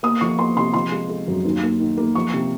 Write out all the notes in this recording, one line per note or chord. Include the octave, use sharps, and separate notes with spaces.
A#3 D#6
F3 C#6
A#3 C6
C3 C6
F3 C6
G#3
G#3
F#2
D#2
A#3
D#3
A#3
F3 C#6
C3